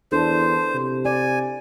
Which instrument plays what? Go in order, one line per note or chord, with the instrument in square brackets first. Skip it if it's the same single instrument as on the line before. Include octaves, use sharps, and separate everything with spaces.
[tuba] E2 [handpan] D4 E4 A4 [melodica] C5
[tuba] C3
[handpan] D5 [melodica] G#5